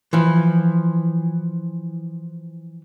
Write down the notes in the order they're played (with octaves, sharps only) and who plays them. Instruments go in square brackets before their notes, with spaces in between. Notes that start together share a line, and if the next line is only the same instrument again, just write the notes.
[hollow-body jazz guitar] E3 F3